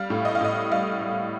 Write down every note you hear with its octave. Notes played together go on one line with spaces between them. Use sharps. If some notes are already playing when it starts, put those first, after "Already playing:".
Already playing: G3 F5
A2
D#5
F5
A2 D#5
G3 F5
G3